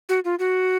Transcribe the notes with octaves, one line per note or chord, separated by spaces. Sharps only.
F#4
F4
F#4